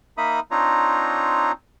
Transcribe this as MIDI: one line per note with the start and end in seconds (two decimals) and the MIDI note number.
0.18 0.40 58
0.18 0.40 63
0.18 0.40 76
0.18 0.40 83
0.18 0.40 87
0.51 1.52 60
0.51 1.52 62
0.51 1.52 63
0.51 1.52 65
0.51 1.52 73
0.51 1.52 82